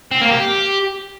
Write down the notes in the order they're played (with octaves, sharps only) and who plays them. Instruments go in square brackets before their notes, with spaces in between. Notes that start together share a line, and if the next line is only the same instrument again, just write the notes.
[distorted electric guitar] C4
A#3
G4